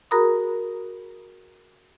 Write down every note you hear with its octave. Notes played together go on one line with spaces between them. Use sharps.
F#4 G#4 A#4 A#5 B5 D#6